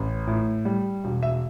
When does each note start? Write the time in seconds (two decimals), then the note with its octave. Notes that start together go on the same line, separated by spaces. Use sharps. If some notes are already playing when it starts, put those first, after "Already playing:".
Already playing: A1
0.27 A2
0.65 G3
1.04 E1
1.23 E5